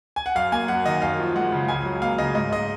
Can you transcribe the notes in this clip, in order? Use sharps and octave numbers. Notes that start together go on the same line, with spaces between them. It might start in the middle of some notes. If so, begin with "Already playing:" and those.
G#5
F#5
F#2 F5
A#3 G#5
F#2 F#5
D#3 D#5
F#2 F5
F3
G#3 F#5
C#3
C#2 G#5
F#3
A#3 F5
C#3 D#5
G#2 D#5
G#3 D#5